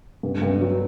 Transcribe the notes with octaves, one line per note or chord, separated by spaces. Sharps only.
G2
G2
F#3